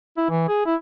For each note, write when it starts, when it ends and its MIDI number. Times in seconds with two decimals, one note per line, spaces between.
0.17 0.25 64
0.30 0.44 52
0.48 0.61 68
0.66 0.75 64